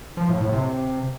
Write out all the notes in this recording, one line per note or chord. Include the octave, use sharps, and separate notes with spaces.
F3
A2
A2
C3